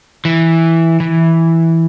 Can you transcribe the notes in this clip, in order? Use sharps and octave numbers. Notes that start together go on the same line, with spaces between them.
E3
E3